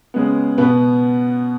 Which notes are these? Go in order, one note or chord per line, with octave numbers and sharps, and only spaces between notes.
C#3 G#3 B3
B2 B3 B4